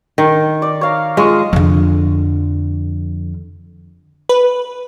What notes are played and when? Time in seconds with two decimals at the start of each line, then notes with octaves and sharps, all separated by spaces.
0.18 D#3
0.62 D5
0.81 C#5 F5 A#5
1.17 G#3 F4 C#6 D#6
1.53 F2 D3
4.29 B4